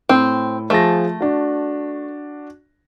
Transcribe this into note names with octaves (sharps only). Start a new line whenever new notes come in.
A2 C4
F3 A3 G#4 A#6
D4 F#4